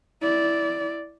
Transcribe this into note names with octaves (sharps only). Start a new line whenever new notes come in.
E4 D5